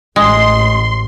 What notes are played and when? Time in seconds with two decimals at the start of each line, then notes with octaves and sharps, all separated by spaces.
0.16 A1 G#3 C6